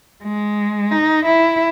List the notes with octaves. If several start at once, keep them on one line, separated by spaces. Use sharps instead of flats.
G#3
D#4
E4